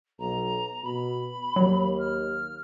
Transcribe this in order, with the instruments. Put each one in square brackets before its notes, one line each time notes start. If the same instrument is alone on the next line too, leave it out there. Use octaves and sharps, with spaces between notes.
[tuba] B1 [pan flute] A#5
[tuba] B2 [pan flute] B5
[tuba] D#2 [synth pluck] F#3
[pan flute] F6